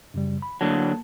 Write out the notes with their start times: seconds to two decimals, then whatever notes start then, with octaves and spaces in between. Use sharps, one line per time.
0.14 F#2 C#3 G3
0.42 B5
0.61 D3 F#3 A#3 A5